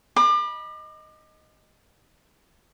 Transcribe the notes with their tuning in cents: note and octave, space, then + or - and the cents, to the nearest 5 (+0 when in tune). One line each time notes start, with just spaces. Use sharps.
D#5 +0 B5 -20 D6 +35